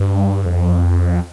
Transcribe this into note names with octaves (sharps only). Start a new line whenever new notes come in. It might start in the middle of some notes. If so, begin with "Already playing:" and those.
Already playing: G2
F2